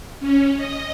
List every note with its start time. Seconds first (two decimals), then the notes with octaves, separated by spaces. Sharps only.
0.20 C#4
0.56 D#5